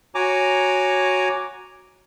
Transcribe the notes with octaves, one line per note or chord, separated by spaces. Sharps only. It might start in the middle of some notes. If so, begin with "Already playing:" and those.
F#4 C#5 G#5 A#5 D6